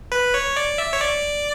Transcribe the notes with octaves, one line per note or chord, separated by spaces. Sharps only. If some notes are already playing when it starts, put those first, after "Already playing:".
B4
C#5
D5
E5
C#5
D5